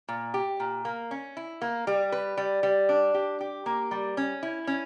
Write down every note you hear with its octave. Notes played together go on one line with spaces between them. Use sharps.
A#2
G4
A#2
A#3
C#4
E4
A#3
G3
B4
G3
G3
D4
G4
G4
A#3
G3
C#4
E4
C#4